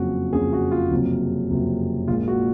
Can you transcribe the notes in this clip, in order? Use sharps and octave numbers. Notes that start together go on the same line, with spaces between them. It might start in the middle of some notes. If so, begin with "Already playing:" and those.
Already playing: F#1 F2 C#3 F#3 F#4
F#1 F2 C#3 F#3 G#4
F#4
F4
F#1 F2 C3 F#3
F#1 F2 C3 F#3
A#1 A#2 G#3 F4
F#4